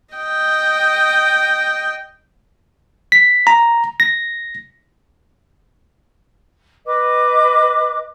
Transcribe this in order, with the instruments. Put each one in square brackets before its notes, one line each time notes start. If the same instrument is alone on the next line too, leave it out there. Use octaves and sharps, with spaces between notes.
[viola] D#5 G5
[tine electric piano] B6
A#5
A#6
[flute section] B4 D#5 D6